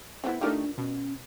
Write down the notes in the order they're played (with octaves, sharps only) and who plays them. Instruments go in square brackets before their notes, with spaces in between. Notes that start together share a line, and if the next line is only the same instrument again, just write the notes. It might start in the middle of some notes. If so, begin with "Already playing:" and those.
[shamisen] E3 A3 B3 [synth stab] C4 E4
[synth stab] A3 D#4 G4 [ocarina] D4 [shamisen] F4 A#4 D5
[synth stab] B2 [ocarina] C#4